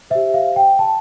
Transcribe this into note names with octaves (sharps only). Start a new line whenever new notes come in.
G4 C5 E5
F5
G5
A5